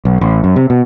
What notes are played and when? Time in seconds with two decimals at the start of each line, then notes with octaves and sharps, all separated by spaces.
0.05 B1
0.21 A1
0.44 F#2
0.56 C3
0.70 B2